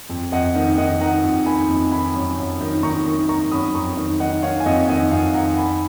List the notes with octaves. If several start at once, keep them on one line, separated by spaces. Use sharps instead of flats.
F2
F2 D#5 F#5
D#3
D#3 D#5 F#5
D#3 F#5 A#5
F2
D#3 G#5 B5
F2
D#3 G#5 B5
F#2
F#2
D#3
D#3 A#5 C#6
D#3
D#3 A#5 C#6
F#2 B5 D#6
F2 A#5 C#6
D#3
D#3 D#5 F#5
D#3 C#5 F5
G#5
F2 D#5 F#5
D#3 D#5 F#5
F2 F5 G#5
D#3 F#5 A#5
D#3 G#5 B5